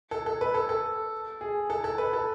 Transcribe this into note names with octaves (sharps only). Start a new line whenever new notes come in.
A4
A4
B4
A4
A4
G#4
A4
A4
B4
A4